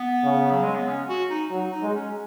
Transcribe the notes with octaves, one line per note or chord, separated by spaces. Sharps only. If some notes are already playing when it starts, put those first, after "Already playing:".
Already playing: B3
C#3
F#3
G#3
B3
C#4
F#4
D#4
F#3 D#4
D#4
G#3
C#4